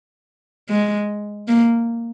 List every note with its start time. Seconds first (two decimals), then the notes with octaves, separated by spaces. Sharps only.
0.70 G#3
1.48 A#3